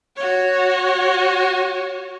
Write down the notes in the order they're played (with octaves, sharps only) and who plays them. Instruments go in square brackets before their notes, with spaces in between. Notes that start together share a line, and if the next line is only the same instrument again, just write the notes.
[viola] F#4 C#5